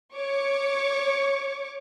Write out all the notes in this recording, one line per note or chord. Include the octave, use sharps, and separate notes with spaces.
C#5 C#6 D6